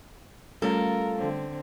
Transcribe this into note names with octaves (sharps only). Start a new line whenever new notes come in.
G3 A3 C#4 F4 A4 A#4
D3 C4